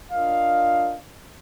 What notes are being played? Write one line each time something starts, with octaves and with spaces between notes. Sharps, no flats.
D4 F4 A#4 D#5 F5